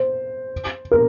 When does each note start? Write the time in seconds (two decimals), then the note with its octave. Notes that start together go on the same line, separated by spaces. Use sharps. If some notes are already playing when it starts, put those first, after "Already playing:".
Already playing: C5
0.91 A#4